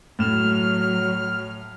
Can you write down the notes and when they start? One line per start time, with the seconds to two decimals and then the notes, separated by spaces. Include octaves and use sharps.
0.19 A2 F#3 F6 E7